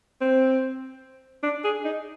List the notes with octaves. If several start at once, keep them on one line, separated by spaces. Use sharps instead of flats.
C4
D4
G#4
D#4